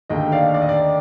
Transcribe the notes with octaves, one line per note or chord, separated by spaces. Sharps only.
D#2 D3 A3 D#5 G5
D5 F5
D5
D#5
D5